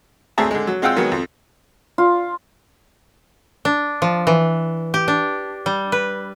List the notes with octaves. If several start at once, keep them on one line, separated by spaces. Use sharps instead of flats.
D2 C4 G#4 E5 A5 A#5
D3 G#3
F#3
G#3 C4 F4 F#5 G5 E6
D#3 F#3 G#3 B3
F2
F4
D4
F3
E3
G4
D4
G3
B4